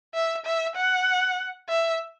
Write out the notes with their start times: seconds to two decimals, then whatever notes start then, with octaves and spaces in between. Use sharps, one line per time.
0.14 E5
0.45 E5
0.75 F#5
1.69 E5